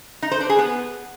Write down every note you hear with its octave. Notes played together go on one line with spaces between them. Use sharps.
D#4
C5
D4
G#4
B3